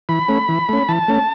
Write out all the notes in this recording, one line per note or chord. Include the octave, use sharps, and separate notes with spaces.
E3 B5
A3 C#4
E3
A3 C#4
E3 A5
A3 C#4